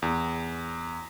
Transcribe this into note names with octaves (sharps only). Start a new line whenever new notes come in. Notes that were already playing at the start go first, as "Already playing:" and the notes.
E2